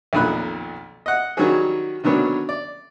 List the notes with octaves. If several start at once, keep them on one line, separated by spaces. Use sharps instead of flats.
B1 F2 A#2 D#3 B5 F#6
D#5 F#5
D#3 F#3 G3 C#4 F#4 G#4
D3 D#3 F#3 B3 C#4 D4
D5